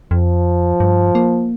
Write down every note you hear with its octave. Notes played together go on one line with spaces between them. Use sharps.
F2 F3
G2
A#3